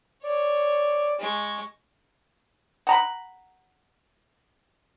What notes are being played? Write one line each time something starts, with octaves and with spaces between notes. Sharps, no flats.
C#5 D5
G#3 C#6
F#5 A#5 B5